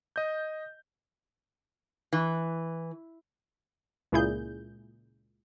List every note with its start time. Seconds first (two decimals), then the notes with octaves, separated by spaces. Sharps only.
0.16 D#5 G6
2.13 E3
4.12 C#2 A#2 E4 G#4 G6